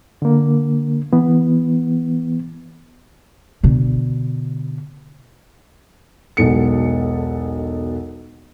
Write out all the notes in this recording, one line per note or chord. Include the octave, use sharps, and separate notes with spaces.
D3 A#3
E3 B3
B2 D3
E1 B1 B2 A4 C#7